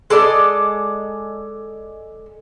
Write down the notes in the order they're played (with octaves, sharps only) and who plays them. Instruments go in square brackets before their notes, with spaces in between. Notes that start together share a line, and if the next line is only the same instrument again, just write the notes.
[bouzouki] G#3 A4 D5 D#5